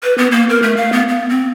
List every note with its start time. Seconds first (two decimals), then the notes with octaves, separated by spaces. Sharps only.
0.03 B4
0.18 B3
0.32 A#3
0.50 A#4
0.62 A3
0.77 F5
0.93 B3
1.09 B3
1.29 C4